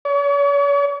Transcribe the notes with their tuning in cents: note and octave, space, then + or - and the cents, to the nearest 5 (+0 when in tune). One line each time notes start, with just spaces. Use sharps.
C#5 +40